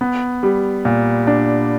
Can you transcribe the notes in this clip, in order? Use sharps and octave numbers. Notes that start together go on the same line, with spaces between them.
B3
G3
A#2
D4